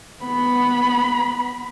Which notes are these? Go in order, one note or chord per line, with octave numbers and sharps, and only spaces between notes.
B3 B5